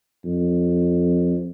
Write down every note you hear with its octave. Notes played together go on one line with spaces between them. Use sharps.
F2